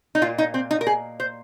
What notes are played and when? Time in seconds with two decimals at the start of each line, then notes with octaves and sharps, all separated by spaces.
0.15 D#4
0.22 A#2 A#3 F4
0.38 D#4
0.54 C4
0.71 D#4
0.81 A#4
0.87 G#4
1.20 C5